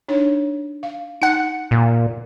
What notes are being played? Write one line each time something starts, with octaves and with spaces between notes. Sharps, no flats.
D4 D#4 C#5
F5
D#4 F#5 C#7
A#2